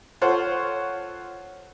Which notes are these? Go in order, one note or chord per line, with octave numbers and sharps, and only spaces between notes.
F4 A4 C5 C#5 F#5